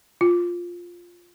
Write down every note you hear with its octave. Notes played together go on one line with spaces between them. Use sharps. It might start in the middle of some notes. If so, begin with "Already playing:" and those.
F4